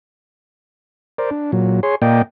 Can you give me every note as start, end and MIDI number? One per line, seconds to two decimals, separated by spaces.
1.18 1.30 70
1.18 1.30 72
1.18 1.30 74
1.31 1.51 62
1.52 1.80 46
1.52 1.80 54
1.83 1.95 68
1.83 1.95 73
1.83 1.95 84
2.02 2.22 46
2.02 2.22 58
2.02 2.22 74
2.02 2.22 75
2.02 2.22 79